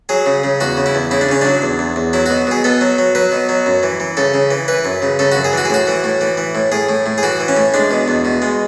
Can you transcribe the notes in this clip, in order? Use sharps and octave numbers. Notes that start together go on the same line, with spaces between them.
F#3 G#4
C#3
C#3
E2 F#4
C#3
E4
E2
C#3 E4
D4
C#3 C#4
F#3 D4
E2
E2
E2
F#3 E4
F#4
B2
B2 G#4
B3 A4
F#3
F#3
F#3 B4
B2
F#3
F#2
E3
E3
C#3 A4
C#3
E3
E3 B4
F#2
C#3
C#3 A4
F#4
F#2
G#4
E3 F#4
G#4
A2 F#4
E3
A2
E3
E3
A2
A2 G#4
A2
A2
G#4
E3 F#4
E3
C#4
A2
G#3 D4
B2
E2
B2
G#3